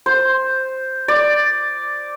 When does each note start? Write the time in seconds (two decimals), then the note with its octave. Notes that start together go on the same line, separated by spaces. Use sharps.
0.06 C5
1.08 D5